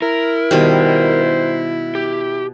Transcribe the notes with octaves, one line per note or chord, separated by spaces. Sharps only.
E4 A#4
B2 D#3 G3 C5
G4